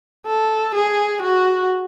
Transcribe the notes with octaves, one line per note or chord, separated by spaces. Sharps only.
A4
G#4
F#4